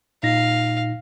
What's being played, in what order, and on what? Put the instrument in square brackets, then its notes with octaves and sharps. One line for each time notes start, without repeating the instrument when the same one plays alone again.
[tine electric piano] A#2 D#4 A#6 [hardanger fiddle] F5